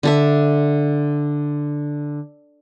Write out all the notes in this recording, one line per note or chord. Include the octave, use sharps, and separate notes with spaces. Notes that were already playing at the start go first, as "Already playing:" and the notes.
D3 A4 E5